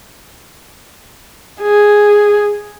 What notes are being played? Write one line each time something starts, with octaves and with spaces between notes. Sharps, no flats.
G#4